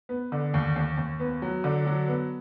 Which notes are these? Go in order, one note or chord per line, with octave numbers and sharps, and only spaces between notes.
B3
D3
D#2
D#2
D#2
B3
F#3
D3
F#3
B3